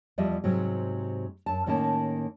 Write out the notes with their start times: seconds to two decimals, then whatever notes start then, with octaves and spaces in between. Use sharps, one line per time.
0.18 E2 F3 G3 D#5 E5
0.44 G#2 C3 F#3
1.46 F#2 A5
1.66 A2 D#3 A#3 C#4 A5